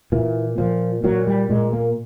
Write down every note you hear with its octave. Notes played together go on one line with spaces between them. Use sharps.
A#2 E3
A#2 F3
A#2 F#3
G3
A#2 G#3
A#3